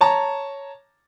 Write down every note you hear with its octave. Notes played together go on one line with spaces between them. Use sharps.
C#5 A5 A#5